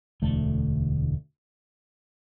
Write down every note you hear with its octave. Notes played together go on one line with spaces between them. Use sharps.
E1 D2 D3 A3